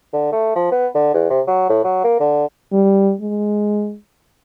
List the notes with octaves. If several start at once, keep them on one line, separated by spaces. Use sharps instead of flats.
D3
A3
F3
B3
D3
E2
C3
F#3
A2
F#3
A#3
D3
G3
G#3